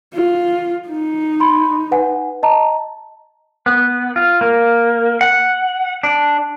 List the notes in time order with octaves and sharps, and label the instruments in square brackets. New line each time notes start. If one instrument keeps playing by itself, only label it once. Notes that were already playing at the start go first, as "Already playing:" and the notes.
[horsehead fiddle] F4
D#4
[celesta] B5 C6
B4 F#5 G#5
D#5 A5 A#5
[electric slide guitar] B3
F4
A#3
F#5
D4